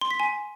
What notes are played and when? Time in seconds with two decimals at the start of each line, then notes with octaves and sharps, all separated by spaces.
0.01 C6
0.11 B6
0.20 G#5